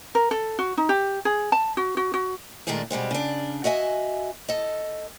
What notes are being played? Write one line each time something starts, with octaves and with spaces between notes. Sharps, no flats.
A#4
A4
F#4
D#4
G4
G#4
A5
F#4
F#4
F#4
A#2 D#3 G#3 A3 D4 G#4
B2 G3 G#3 C4
C#3 D4
F#4 D#5 E5 G#5
A4 D#5